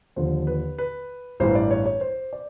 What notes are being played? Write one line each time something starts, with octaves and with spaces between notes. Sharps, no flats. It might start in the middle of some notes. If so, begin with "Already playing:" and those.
D#2 D3 F3 C5
B4
B4
A1 G2 E3 C5
D5
C#5
C#5
C5
D5